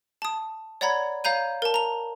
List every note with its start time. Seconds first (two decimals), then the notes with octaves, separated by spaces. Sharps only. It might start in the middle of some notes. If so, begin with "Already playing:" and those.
0.22 A5 D#6
0.81 C#5 D5 F#5 A#5 B5 G#6
1.24 C#5 F5 A#5 G6 D#7
1.62 A#4 A5
1.74 A#5 F7